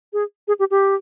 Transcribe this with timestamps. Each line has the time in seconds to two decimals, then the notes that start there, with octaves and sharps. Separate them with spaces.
0.13 G#4
0.48 G#4
0.59 G4
0.71 G4